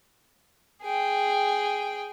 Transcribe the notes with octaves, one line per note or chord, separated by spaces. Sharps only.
G#4 G5